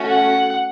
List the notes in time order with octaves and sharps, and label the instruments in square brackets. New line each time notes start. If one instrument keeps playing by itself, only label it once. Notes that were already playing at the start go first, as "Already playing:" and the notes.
Already playing: [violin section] A3 C#4 F#4
[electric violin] F#5